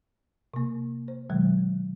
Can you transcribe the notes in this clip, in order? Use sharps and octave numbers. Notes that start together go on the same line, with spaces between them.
C3 A#3
C5
B2 D#3 F#3 G#3